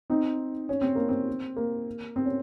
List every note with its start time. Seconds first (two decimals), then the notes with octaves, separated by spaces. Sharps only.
0.10 C4 D#4
0.69 C#4
0.81 C4
0.95 A#3
1.09 C4
1.57 A#3
2.16 C4
2.26 C#4